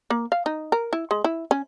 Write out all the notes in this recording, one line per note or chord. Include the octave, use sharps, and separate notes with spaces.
A#3
F5
D#4
A#4
E4
G#3
E4
C#4